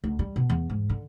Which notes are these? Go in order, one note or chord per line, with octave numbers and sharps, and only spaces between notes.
D2
G3
B2
E2
G#2
D3